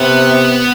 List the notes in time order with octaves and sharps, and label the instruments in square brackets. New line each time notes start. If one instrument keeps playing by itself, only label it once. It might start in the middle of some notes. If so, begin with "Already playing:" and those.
Already playing: [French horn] C3 [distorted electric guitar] B3